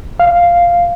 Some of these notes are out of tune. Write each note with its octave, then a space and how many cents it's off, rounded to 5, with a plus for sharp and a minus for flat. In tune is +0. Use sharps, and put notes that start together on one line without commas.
F5 -5